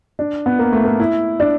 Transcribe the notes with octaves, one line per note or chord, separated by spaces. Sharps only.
D4
B3
A#3
A3
A#3
E4
D4